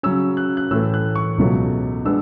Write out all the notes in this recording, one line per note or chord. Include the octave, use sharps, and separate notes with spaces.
C#3 F#3 C#4 E6
F#6
F#6
A2 E3 A3 E6
F#6
C#6
C#2 B2 F#3 A3
G#3 B3 D4 E6